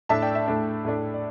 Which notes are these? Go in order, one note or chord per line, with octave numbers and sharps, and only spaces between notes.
A2 A3 D4 E5 A5
D5 G5
E5
A2 A3 D4 E5
A2 A3 D4
D5